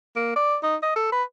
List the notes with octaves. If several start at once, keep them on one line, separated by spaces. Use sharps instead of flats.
A#3
D5
D#4
D#5
A4
B4